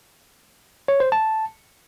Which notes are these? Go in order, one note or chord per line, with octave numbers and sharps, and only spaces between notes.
C#5
C5
A5